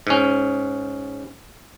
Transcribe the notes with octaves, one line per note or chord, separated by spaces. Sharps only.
G#2 C#4